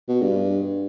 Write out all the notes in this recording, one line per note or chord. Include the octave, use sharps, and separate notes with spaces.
B2
G2